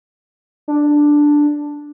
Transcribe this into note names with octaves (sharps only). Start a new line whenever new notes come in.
D4